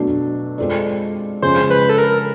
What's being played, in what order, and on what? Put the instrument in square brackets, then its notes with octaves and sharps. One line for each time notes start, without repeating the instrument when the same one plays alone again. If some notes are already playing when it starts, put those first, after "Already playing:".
Already playing: [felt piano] B2 F#3 A3 D4
G#3 C4 F4 A4 D5
[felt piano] C#3 F3 G#3 C#4 [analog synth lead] C5
[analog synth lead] B4
A4
A#4